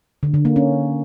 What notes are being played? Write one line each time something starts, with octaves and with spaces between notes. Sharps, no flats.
D3
D3
A#3
C#4